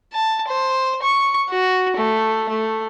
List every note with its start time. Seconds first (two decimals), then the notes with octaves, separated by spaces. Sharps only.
0.13 A5
0.48 C5
1.03 C#6
1.50 F#4
1.96 A3
2.49 A3